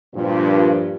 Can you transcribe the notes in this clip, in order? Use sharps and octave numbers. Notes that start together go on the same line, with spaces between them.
G2 A#2 F3